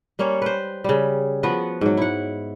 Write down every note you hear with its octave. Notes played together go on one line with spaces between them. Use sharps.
G3 A#3 C#4 C#5
B4 C5
C#3 G3
F3 B3 F#4 B4
G#2 F#3
E4 F#5